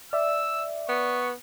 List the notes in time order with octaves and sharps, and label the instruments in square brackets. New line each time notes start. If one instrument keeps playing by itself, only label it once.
[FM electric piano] D5 E5 [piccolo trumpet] E6
[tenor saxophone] B3 [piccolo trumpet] C#6